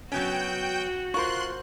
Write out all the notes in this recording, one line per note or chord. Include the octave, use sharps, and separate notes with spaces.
F#3 B3 C#4 F#4 G5 G6
F4 A#4 C5 C6 C#6 F#6